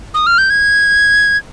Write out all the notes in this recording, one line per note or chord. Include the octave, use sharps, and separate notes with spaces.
D#6
F6
G6
G#6